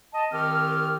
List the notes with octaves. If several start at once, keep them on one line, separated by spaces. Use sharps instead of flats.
D#5 A5
C2 D#3 C4 G4 F6